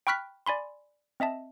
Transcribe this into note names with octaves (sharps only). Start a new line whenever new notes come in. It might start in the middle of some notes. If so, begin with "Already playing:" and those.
G5 B5 C#6 F6 F#6 B6
D5 G#5 B5 C6
C4 D#5 E5 A5